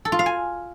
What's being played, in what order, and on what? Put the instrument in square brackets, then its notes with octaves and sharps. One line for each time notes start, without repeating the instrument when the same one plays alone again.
[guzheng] A4
F4
F5
G#5